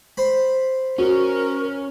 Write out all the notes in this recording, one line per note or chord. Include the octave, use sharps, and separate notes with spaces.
C5 B5
C#4 F#4 A#4